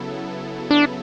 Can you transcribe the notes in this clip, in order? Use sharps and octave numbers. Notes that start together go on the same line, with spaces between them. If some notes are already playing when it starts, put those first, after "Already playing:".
Already playing: C#3 F#3 B3 E4 A4
D4